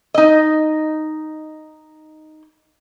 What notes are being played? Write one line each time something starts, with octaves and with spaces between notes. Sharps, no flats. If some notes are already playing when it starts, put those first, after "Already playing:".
D#4 D#5